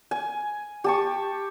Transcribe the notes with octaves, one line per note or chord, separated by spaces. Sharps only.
G#5
G4 A5 C#6